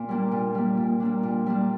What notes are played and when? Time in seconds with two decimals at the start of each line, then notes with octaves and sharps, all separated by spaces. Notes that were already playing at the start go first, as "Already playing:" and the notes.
Already playing: A#2
0.09 G3 A#3 D4
0.31 A#2
0.55 G3 A#3 D4
0.77 A#2
1.00 G3 A#3 D4
1.23 A#2
1.46 G3 A#3 D4